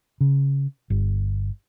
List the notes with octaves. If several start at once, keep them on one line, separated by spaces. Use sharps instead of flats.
C#3
G1